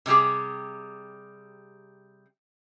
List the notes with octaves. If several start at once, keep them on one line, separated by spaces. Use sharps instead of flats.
C3 D#3 G3 G4 G#4